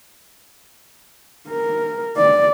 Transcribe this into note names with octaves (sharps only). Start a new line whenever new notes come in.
A#4
D5